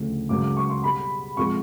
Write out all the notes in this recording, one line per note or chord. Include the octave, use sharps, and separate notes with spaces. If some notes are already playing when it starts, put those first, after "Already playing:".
Already playing: D2 C#3 F3 A3
C#2 C#3 F#3 A#3 C#4 D6
D6
C#6
C6
B2 G3 B3 B5
C3 F3 G#3 B3 C#6